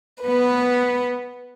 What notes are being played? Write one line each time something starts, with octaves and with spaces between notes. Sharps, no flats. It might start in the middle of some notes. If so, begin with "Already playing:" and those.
B3 B4